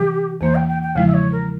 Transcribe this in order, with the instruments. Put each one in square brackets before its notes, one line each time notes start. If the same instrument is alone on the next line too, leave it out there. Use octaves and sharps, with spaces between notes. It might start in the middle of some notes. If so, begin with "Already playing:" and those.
Already playing: [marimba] C3 E3 G3 [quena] G4
[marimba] E2 E3 A#3 [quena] C5
[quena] G5
G5
G5
[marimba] E2 C#3 F3 G#3 E4 [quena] F5
[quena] E5
C#5
A#4